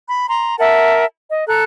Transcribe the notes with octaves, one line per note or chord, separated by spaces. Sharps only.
B5
A#5 C6
A#4 E5 F#5 A5
D#5
A4 A#5 F#6